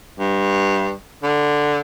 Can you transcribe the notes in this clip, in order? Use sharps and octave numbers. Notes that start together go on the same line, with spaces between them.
G2
D3